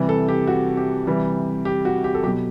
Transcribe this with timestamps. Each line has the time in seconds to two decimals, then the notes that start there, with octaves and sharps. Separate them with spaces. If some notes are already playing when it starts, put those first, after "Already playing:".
Already playing: C3 E3 G3
0.09 A4
0.28 G4
0.47 F#4
0.77 G4
1.07 C3 E3 G3
1.65 G4
1.85 F#4
2.04 G4
2.15 A4
2.23 F#3 G4
2.27 B2